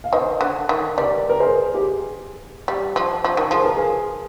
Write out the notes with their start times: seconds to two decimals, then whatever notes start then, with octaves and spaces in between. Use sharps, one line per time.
0.04 F5
0.13 D#3 C5 D#5
0.41 D3
0.69 D#3
0.98 G3 A#4 D5
1.30 A#4
1.40 G#4 C5
1.74 G4
1.83 G#4
2.68 G3 G4
2.96 F3
3.24 F3
3.37 D#3
3.51 F3 G#4
3.65 A#4
3.76 G#4